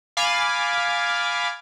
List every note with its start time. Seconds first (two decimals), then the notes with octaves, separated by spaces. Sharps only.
0.17 F5 G#5 B5 D6 A6